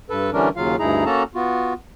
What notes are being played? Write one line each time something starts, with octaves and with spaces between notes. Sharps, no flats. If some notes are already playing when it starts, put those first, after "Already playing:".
G2 A4 B4
D3 E3 G3 C#4 D4 A#4
D#2 C#3 F#3 F4 F5
D2 G2 D#4 E4 G#4 A#5
A#3 C#4 F#4 A4 A5 A#5
B3 F4 F#4